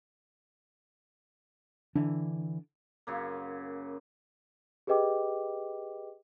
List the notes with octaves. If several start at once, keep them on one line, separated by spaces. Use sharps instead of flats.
D3 E3 D4
F#2 C#3 A#3
G4 G#4 B4 D#5 G5 D6